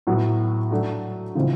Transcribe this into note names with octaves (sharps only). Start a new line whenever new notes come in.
A2 F#3 B3
F#3 A3 D4 F#4
C#3 E3 G#3 C4 F4